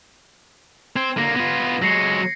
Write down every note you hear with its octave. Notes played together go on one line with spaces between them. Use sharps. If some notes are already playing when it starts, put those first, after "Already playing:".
C4 G#6
D3 A#3 A#6 C7
B3 F4
F#3 G#3 A#6 C7 C#7